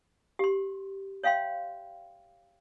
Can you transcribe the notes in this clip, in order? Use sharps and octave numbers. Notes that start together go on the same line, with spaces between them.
G4 C6
C#5 E5 F5 G5 C6